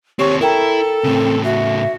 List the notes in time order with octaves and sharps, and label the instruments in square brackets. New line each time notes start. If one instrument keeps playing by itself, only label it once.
[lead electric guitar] D#2 C4 [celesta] G4 C#6 [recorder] C#5
[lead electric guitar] E4 [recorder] A4 [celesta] A#4 G5 A#5
[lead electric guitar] A2 C#3 [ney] C4
[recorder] F#4 [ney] E5